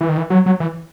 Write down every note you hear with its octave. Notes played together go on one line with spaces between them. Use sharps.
E3
D#3
E3
F#3
F#3
E3